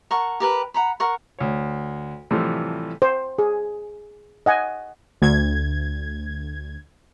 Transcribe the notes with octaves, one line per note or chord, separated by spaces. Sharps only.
A#4 F#5 A5 C#6
G4 A#4 B4
F#5 A#5 B5
A#4 F#5 C#6
D2 C#5
A2 C3 E3 F3 G3 A3
C5
G#4
D#5 F#5 G#5
D2 G#6